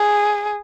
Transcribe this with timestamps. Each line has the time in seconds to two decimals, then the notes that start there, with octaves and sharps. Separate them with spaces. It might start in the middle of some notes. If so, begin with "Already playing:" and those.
Already playing: G#4